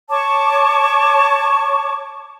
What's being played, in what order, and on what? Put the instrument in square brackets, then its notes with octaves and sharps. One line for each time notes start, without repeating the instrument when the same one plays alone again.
[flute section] C#5 A5 C#6 D6